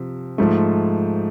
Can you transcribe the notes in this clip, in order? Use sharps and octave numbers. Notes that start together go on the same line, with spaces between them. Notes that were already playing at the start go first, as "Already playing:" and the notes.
Already playing: C3 F3
G#2 F3 A3